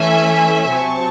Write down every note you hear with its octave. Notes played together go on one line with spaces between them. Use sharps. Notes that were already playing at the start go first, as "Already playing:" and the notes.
Already playing: E3 A3 C#4 E5 G#5
C3 F#3 C4 A5 C#6